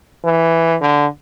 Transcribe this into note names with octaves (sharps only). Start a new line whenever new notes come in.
E3
D3